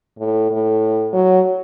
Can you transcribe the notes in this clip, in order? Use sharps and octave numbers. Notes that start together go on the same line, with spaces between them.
A2
A2
F#3